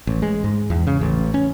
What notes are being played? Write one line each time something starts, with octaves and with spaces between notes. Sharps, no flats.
A1
G#3
G#2
E2
C#3
A1
C#4